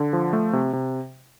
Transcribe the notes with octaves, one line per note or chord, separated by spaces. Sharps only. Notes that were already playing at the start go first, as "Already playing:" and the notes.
Already playing: D3
F3
A3
C3
C3